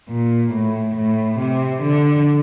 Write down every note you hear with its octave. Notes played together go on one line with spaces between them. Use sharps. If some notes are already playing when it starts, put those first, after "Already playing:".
A#2
A2
A2
C3
D3